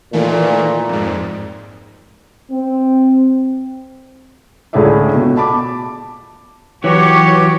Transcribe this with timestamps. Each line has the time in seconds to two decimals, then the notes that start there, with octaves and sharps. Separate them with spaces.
0.13 A#2 D#3 E3 A3
0.89 F2 G#2
2.51 C4
4.73 C#2 A2 D3 G#4 D5 E5
5.15 B2
5.37 A5 B5 D6
6.84 E3 F#3 G4 C#5